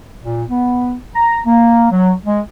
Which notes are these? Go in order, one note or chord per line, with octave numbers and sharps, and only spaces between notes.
A#2
B3
A#5
A#3
F#3
G#3